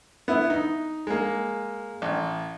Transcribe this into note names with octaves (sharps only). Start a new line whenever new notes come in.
B3 E4
D#4
G#3 A#3
A1